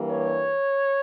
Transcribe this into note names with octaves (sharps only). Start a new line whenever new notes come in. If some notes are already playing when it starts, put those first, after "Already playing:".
Already playing: G2 E3 G3 A#3
C#5